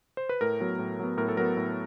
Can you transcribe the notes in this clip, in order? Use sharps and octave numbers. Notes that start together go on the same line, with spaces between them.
C5
B4
A2 A#4
F#3 B3
A2
F#3 B3
A2 A#4
A4
F#3 B3 A#4
A2